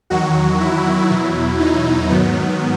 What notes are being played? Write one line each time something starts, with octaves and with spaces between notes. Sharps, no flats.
E2 D#3 F#3 F#4
E4
E2 B2 F#3
D#4
G#2 D#3 F#3 B3